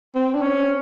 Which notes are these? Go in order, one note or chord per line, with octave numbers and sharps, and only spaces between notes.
C4
D4
C#4